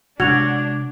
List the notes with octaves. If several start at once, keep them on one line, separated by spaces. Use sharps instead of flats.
C3 G#3 D4 F#4 G#6 F7